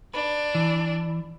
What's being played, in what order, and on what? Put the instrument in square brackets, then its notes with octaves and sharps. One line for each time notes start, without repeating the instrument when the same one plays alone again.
[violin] D4 [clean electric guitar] B4
[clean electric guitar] E3